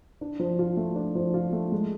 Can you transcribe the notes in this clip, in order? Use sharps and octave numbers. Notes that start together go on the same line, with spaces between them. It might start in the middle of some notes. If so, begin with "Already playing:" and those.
D4
F3
F4
A3
D4
F3
F4
A3
G#3